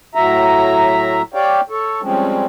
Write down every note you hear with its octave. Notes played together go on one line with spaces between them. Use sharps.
A2 F#3 E5 A#5
G4 C#5 D5 F5 G5
A4 C#5
F3 G3 G#3 C4 C#4